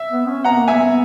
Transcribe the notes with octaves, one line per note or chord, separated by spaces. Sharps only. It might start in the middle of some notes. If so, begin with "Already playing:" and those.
Already playing: E5
B3
C#4
B3 F#5 A#5
A#3
B3 E5 G#5